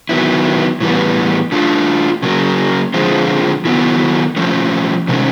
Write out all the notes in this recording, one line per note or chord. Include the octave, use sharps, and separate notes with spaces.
D#3 F#3 B3 E4
A2 E3 G3 B3
A3 D4 F4
C#3 F#3 A#3
D3 F3 G#3 C4 F4
D#3 F#3 B3 E4 A4
F3 A3 C#4
C3 D#3 G#3 C#4